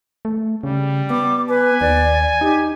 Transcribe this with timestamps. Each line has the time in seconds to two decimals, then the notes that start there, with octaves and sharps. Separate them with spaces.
0.25 A3
0.63 C#3 G3
1.10 B3 D6
1.49 B4 G#5
1.81 D#2 D5
2.41 D#4 G4